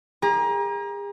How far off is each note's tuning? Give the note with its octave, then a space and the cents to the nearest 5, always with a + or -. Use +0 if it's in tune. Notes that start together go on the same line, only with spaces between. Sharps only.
G#4 -40 A#5 +25